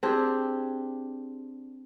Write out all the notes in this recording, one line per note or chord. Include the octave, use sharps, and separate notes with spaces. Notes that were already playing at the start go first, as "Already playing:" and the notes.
C4 D4 G4 G#4